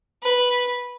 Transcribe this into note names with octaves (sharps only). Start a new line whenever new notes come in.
B4